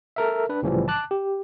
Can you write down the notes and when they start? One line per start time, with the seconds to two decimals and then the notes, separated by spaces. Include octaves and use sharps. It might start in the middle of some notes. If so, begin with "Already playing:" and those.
0.16 A4 A#4 E5
0.49 D4 B4
0.62 C2 A2 C#3 E3 F3 G3
0.88 A5 D6 F#6
1.11 G4